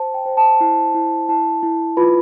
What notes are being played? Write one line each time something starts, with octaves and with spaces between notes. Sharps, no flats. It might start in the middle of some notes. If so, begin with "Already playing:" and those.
Already playing: C5 A5
G5
C5
A5
E4
E4
E4 A5
E4
F4 B4 B5